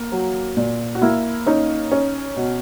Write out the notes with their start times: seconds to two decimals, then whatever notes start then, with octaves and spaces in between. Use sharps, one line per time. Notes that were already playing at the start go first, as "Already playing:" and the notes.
Already playing: A#3
0.12 F#3
0.57 A#2
0.95 F#4
1.02 A#3 E4
1.46 C#4 D#4
1.92 C#4
2.36 B2